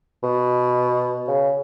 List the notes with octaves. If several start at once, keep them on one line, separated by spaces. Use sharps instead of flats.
B2
C#3